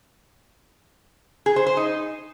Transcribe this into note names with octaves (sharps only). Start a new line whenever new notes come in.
G#4
C5
C5
D#4